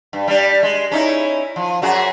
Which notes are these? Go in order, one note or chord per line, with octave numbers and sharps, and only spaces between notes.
G2
G3 D4
G#3
C#4 D#4 E4
F3
F#2 F#4 G#4